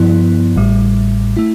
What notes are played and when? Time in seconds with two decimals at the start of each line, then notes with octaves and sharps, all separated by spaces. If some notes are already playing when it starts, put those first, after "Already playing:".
Already playing: G2 F3 B3 E4
0.56 A1 A2 G3
1.37 A3 E4